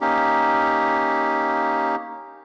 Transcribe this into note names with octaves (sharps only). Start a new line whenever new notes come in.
A#3 C#4 D#4 G4